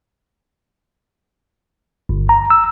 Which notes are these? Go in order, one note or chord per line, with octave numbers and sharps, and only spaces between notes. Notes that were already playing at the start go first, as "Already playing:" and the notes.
G1
A#5
E6